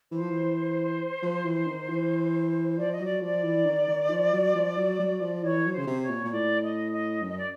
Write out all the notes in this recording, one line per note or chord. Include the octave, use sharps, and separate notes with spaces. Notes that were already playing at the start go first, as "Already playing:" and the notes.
E3 C5
F3
E3
F3
E3
D#3
E3
F3 D5
D#5
F#3 D5
F3 D5
E3
D#3
D#3
F3
F#3
F3
F#3
F#3
F3
E3 C#5
F#3
C#3 C5
C3
C#5
A#2
A#2
A2 D5
D#5
D#5
F#2
D#5
D5